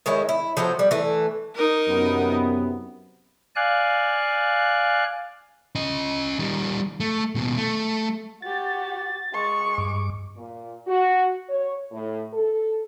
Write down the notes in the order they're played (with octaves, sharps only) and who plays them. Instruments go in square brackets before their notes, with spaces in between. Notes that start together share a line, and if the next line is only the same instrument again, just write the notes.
[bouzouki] D#3 G#3 E4 C#5
E4
F3 F#3 A3 C5
G3
E3 A3
[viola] D#4 A#4
[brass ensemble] F#2 C3 B3
[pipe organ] D5 F5 G#5 F#6
[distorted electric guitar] C#4 D#5
D#3 G3
A3
D#2 B2
A3
[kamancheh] F#4 G4 [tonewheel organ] A6
[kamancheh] G#3 C#6
[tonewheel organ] G2 D6
[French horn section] A#2
F#4
C#5
A2
A4